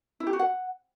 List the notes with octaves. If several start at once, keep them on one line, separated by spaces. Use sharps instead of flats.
E4
G4
F#4
F#5